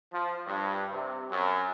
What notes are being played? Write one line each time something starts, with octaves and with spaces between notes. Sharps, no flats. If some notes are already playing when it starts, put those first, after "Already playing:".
F3
G2
C3
F#2